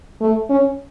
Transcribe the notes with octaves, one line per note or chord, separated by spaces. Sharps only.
A3
C#4